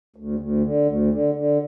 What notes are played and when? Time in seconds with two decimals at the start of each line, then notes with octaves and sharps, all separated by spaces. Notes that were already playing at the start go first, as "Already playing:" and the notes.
0.16 D2
0.39 D2
0.64 D3
0.87 D2
1.11 D3
1.35 D3